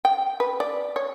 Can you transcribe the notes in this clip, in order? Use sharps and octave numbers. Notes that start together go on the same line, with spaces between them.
G5
B4
D5
C#5